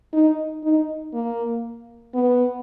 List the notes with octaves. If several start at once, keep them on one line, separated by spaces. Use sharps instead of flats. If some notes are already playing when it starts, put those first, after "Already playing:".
D#4
D#4
A#3
B3